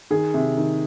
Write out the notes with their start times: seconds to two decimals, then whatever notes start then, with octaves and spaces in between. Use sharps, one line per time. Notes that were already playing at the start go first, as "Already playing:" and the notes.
0.11 D#3 G#4
0.34 C3
0.57 D#3